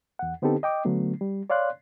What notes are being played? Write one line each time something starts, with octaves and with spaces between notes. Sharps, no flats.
E2 F#5
D3 B3 C4 D#4 G4 A4
D#5 G5 D6
D3 F#3 A3 B3
G3
C#5 D5 F5 C6 F#6